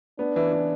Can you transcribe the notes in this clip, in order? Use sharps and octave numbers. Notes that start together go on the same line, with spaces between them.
B3 D4
E3
E3